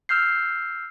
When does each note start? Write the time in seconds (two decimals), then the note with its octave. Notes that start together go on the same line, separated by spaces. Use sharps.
0.09 E6 F6 G6 C7